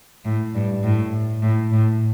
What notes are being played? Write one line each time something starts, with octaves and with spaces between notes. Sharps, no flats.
A2
G2
A2
A2
A2